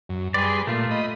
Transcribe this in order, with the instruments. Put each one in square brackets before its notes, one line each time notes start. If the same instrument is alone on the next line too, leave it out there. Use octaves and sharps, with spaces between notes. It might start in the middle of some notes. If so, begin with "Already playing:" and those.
[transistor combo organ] F#2
[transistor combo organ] G3 B4 C6 [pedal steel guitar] G#4 D5
[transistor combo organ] A#2 [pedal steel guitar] A3 F4
[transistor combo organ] D#5 B5